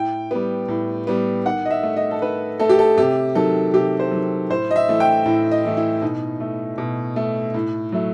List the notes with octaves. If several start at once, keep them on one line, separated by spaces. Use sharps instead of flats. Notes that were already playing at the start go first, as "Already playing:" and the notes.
Already playing: A2 G5
G3 B3
A2
G3 B3
D#3 F#5
D#5
E5
A3
D#5
A4
D#3 B4
A3 A4
G4
A4
C3 G4
D#3 F#3 A4
C3 G4
C5
F#3
D#3
A2 C5
D#5
E5
E3 A3
G5
A2
D#5
E3 A3
E4
B2 D#4
A3
B2
A3
A2
F#3 A3